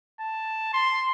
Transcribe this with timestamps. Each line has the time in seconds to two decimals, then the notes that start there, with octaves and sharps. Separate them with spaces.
0.20 A5
0.73 C6